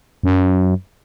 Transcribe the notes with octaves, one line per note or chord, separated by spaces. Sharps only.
F#2